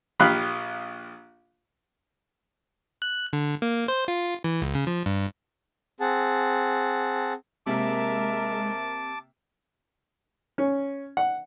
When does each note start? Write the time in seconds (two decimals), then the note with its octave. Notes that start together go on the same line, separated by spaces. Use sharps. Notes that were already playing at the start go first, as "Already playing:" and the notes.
0.20 A#1 G4 F5 B5 F#6
3.02 F#6
3.33 D3
3.62 A#3
3.88 C5
4.08 F4
4.44 E3
4.62 C#2
4.75 C#3
4.87 F3
5.06 G2
6.00 C4 G#4 F#5 A5
7.66 C3 G#3 A#3 A#4 E5 A5 D6
10.58 C#4
11.17 F#5